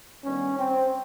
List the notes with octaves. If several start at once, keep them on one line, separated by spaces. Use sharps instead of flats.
G2 D#3 G3 B3 C#4
C4